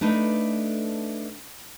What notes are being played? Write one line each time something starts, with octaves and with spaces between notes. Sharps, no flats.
A3 D4 D#4 A4 B4